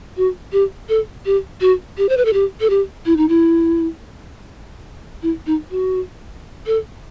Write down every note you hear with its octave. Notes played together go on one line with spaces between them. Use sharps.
F#4
G4
A4
G4
F#4
G4
C5
B4
A4
G4
A4
G4
E4
D#4
E4
E4
D#4
F#4
A4